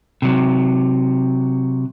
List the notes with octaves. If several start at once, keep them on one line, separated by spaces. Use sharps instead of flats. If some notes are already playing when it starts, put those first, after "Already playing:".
C3 F#3